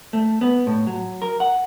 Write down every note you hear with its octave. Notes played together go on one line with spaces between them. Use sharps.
A3
B3
A2
F#3
A#4
F#5